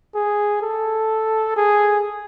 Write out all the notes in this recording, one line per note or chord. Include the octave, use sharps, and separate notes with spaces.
G#4
A4
G#4